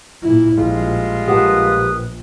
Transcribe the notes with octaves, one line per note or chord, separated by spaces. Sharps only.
A#2 E4
A#1 G3 G#3 F4
A#1 G4 A#4 B4 F#5 A5 D#6